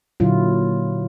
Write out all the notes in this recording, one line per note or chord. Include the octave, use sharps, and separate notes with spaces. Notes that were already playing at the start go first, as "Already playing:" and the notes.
A#2 D3 F#3 E4 F4